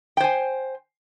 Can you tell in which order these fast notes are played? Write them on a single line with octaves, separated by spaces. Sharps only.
G5 C5 G#5